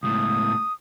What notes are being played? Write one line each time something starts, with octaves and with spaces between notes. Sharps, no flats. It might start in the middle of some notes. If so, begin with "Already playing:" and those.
C#2 A2 D#6